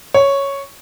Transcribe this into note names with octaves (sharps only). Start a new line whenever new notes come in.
C#5